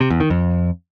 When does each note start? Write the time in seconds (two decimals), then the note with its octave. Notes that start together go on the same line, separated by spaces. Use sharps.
0.01 C3
0.10 E2
0.20 D#3
0.30 F2